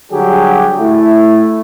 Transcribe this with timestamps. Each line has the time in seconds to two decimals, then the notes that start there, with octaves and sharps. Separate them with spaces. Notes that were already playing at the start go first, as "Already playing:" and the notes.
0.12 D3 F#3 G3 G4 G#4
0.79 A3 E4